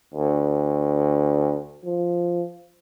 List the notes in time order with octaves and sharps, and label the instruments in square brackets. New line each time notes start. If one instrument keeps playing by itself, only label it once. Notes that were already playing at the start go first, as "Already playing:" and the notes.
[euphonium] D2
F3